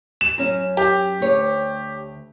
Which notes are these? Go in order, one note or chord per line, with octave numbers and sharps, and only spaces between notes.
E7
F#2 C#4
G4
D2 C#5